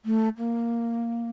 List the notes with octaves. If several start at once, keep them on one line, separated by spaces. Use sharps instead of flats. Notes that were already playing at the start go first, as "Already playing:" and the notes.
A3
A#3